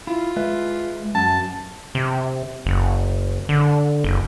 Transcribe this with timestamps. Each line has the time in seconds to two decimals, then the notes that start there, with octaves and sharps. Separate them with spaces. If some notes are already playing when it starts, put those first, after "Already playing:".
0.07 E4 F4
0.36 G#3 B4 E5
1.15 F#2 A5
1.95 C3
2.66 F#1
3.49 D3
4.04 F#1